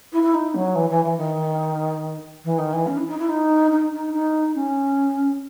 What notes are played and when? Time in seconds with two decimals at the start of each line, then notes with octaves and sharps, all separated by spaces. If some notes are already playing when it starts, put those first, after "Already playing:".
0.12 E4
0.23 E4
0.34 D#4
0.54 F#3
0.75 E3
0.89 E3
1.04 E3
1.17 D#3
2.44 E3
2.58 D#3
2.73 E3
2.86 C#4
2.97 E4
3.07 D#4
3.18 E4
3.29 D#4
3.71 D#4
3.92 D#4
4.13 D#4
4.55 C#4